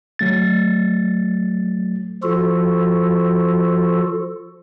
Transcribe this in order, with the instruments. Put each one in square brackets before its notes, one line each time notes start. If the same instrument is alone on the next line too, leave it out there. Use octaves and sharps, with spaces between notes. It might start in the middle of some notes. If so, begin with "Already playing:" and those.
[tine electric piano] F#3 A3 A6
[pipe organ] F3 F4 F#4 A4